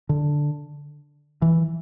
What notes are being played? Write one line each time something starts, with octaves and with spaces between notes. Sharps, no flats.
D3
E3